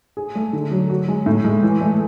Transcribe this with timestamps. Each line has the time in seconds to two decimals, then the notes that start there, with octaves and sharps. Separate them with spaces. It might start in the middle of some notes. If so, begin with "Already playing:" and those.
0.17 G#4
0.35 A3
0.53 D3
0.71 F#3
0.90 F#4
1.08 G#3
1.26 A2
1.44 G#3
1.63 E3
1.81 A3